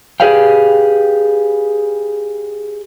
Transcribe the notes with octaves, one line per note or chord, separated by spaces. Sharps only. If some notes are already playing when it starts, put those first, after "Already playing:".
G4 G#4 B4 D5 F5 G5